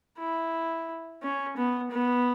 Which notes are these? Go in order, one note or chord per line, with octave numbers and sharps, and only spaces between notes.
E4
C#4
B3
B3